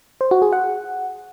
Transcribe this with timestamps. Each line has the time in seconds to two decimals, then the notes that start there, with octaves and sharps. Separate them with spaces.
0.21 C5
0.31 F#4
0.42 G#4
0.53 F#5